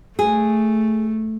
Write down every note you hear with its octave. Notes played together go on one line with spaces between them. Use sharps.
A3 G#4